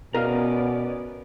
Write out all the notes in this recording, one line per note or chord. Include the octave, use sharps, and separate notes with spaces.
B2 B3 C#4 A#4 D5 D#5 F5